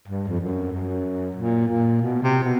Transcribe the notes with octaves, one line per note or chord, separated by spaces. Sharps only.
G2
F2
F#2
F#2
A#2
A#2
B2
C3
B2